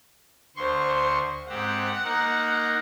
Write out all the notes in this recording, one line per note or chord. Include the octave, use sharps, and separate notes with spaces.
D2 C5 C6 C#6
G#2 C4 G4 F#5
A#3 D#4 A#4